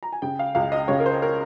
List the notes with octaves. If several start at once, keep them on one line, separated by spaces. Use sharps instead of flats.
A#5
G#5
C#3 G5
F5
C#2 F5
D#5
C#3 C#5
A#4
C5
A#4